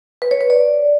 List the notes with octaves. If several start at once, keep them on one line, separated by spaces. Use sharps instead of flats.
B4
C#5
B4
D5